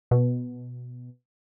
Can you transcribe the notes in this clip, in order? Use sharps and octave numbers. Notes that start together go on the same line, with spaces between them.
B2